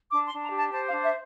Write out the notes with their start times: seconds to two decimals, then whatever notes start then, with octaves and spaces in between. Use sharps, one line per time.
0.11 D4 D6
0.27 C6
0.32 D4
0.42 A#5
0.52 G4
0.58 A5
0.73 C5 A5
0.88 F5
0.93 D4
1.03 E5